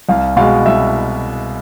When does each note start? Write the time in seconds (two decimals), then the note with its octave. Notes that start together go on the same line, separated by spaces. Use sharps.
0.09 C2 F5
0.37 B2 G#3 F5
0.66 C2 E5